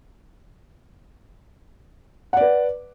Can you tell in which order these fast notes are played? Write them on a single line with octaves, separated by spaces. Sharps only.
F#5 D5 B4